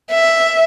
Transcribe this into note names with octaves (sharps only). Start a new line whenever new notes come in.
E5